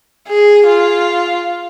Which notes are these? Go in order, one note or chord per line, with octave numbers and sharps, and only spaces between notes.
G#4
F4